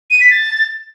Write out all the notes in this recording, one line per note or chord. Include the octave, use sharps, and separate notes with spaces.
D#7
B6
A6